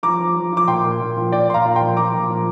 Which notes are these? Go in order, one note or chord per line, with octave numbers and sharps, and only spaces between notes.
F3 A#5 D6
F3
F3
F3 D6
A#2 G5 C6
A#2
A#2
F3
A#2 D5 G5
A#2 C6
F5 A#5
A#2
G5 C6
F3
F3 A#5 D6
A#2
F3